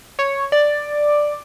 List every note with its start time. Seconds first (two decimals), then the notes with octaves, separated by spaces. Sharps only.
0.19 C#5
0.52 D5